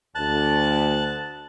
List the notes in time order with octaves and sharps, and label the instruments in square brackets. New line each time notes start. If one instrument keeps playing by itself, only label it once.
[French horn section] D2 [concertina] A5 F#6